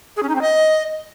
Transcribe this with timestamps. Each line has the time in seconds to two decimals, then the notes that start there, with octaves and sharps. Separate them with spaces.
0.17 G#4
0.23 C#4
0.29 D#4
0.35 C4
0.41 D#5